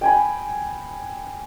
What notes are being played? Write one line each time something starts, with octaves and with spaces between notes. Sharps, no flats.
G5 G#5 B5